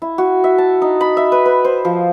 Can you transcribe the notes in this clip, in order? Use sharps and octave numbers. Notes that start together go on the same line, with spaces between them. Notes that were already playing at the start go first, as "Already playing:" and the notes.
E4
F#4
E5
A5
D#4
B5
E5
B4
B4
C5
F3